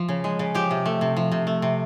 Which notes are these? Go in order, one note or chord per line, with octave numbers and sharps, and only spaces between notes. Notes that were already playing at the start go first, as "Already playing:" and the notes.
Already playing: F3
C#3
G#3
C#3
F3 G4
C3
A3
C3
F3
C3
A3
C3